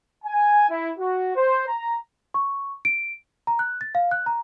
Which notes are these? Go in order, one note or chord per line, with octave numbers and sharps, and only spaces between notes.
G#5
E4
F#4
C5
A#5
C#6
D7
A#5
F#6
A6
F5
F#6
A#5